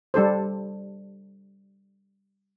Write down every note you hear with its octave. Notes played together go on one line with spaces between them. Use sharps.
G3 D4 A4 C5